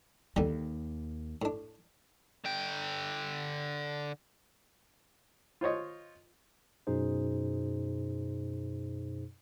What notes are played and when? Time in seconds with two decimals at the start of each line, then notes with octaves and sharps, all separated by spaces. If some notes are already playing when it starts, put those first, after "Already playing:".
0.36 D#2 D3 G3
1.42 A2 D4
2.44 D3 G5
5.61 F4 C5 C#5 D#5
6.87 F#2 B2 D#4 G#4 C5